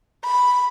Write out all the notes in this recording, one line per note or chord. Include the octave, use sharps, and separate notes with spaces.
B5